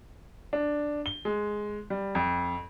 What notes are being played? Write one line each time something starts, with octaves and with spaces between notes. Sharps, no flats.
D4
G7
G#3
G3
F2